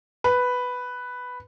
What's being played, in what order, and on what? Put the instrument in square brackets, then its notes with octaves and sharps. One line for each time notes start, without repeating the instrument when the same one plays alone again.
[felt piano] B4